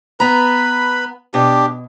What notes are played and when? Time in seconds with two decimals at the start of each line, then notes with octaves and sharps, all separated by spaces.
0.20 B3 B4 A#5 B5
1.34 B2 D4 G4